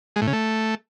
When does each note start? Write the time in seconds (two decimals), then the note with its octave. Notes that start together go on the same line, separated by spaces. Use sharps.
0.16 G#3
0.22 A2
0.27 C#3
0.33 A3